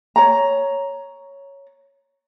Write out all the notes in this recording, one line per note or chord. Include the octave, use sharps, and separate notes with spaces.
C#5 A#5